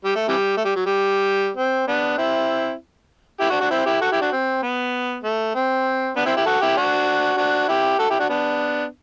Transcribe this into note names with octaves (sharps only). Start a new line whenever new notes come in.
G3
A3
C3 E3 G3
A3
G3
F#3
G3
C4
B3 D4
C4 E4
E4 G4
D4 F#4
D4 F#4
C4 E4
E4 G4
F#4 A4
E4 G4
D4 F#4
C4
B3
A3
C4
B3 D4
C4 E4
E4 G4
F#4 A4
E4 G4
D4 F#4
D4 F#4
E4 G4
F#4 A4
E4 G4
D4 F#4
B3 D4